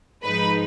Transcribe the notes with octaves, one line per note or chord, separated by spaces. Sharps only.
G#2 F3 G#3 D#4 B4 B5